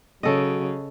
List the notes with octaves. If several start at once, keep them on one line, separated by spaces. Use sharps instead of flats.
C#3 F#3 A4 D#5